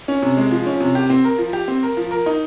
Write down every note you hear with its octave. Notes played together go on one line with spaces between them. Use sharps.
C#4
C3
G#3
F3
C#4
C3
G4
C4
A#4
F3
G4
C4
A#4
F3
A#4
D#4